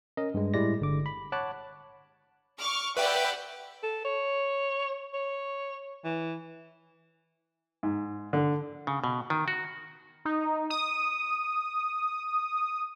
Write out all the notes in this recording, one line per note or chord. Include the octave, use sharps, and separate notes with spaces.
C#4 A#4 D#5
G2 G#3
A2 G3 G#3 E4 D5 A#6
G1 D3 D6
B5
C#5 F#5 A5 B5 D6 F#6
C#6 D6 F6
G4 B4 D5 E5 F#5 G5
A4
C#5
C#5
E3
G#2
D3
C#3
B2
D#3
F#4
D#4
D#6